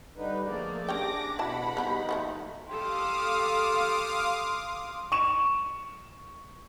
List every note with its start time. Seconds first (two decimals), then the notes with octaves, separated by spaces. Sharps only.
0.17 D3 G3 D#4 B4
0.47 F3 A3 A#3 G#4 D5
0.89 C#4 D4 G4 G5 D6 A#6
1.39 B2 E4 F#4 F#5 A5 B5
1.77 F3 G3 B3 D#4
2.09 F3 A3 B3
2.68 G4 A4 F5 C6 D6 D#6
5.12 C#6 E7